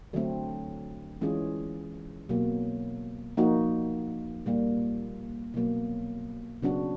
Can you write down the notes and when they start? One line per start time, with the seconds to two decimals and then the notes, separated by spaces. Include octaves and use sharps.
0.13 D3 F#3 A3 C4
1.21 E3 G#3 C#4 F4 G#4
2.29 B2 F#3 A#3
3.37 F3 A#3 D#4 F#4
4.46 A#2 G3 A#3
5.54 B2 F#3 A#3
6.62 C#3 F#3 B3 D4 F#4